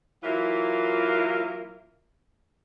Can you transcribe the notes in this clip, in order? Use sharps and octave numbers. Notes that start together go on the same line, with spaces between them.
E3 F#3 A#3 E4 F4